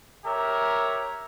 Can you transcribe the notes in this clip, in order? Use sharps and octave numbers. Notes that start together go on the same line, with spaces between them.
G4 A#4 C#5 E5